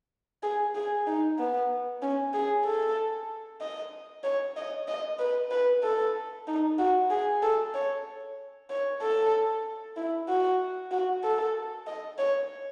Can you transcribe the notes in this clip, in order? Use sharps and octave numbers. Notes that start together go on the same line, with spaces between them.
G#4
G#4
D#4
B3
C#4
G#4
A4
D#5
C#5
D#5
D#5
B4
B4
A4
D#4
F#4
G#4
A4
C#5
C#5
A4
E4
F#4
F#4
A4
D#5
C#5